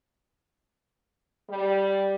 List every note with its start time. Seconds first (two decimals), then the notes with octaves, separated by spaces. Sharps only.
1.49 G3